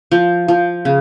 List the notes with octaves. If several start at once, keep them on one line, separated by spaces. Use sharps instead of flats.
F3
F3
C#3